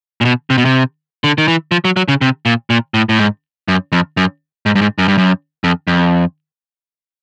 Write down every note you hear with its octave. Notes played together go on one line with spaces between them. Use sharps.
A#2
B2
C3
B2
C3
D3
D#3
E3
F3
F#3
F#3
C#3
C3
A#2
A#2
A2
A2
G#2
F#2
F2
F#2
G#2
G2
G#2
F#2
G2
F#2
F2
F2